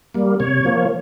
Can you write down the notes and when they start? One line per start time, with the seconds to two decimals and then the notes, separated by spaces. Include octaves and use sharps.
0.14 G3 A#3
0.40 C3 C#5
0.65 F3 A#3